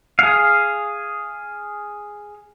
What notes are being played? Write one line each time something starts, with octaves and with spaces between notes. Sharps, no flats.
G#4 F5